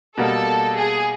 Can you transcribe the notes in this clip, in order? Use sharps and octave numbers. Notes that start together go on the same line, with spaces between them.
B2 G3 A#3 A4
G#4